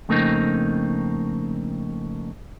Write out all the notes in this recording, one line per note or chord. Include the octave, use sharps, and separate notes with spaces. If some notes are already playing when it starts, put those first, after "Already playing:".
F2 C#3 A3 A#3 C4 D#4